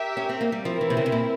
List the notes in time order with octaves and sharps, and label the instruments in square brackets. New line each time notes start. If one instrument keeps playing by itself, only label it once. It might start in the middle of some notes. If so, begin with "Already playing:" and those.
Already playing: [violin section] G4 A#4 E5
[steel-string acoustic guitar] C#4
C4
A#3
G3
[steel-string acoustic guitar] F3 [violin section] C4 E4 A#4
[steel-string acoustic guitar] E3
C3
C#3
C3
A#2